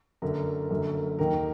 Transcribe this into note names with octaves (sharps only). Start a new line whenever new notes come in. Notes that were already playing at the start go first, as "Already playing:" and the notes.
F#1 F#2 D3 A#4
F#1 F#2 D3
D#2 D#3 A#4